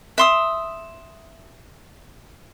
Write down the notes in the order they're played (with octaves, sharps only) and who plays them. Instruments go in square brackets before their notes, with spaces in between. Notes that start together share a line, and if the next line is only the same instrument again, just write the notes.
[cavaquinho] E5 C6 D#6